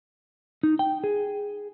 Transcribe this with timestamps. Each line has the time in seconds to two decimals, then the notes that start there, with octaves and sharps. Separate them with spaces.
0.63 D#4
0.79 G5
1.04 G#4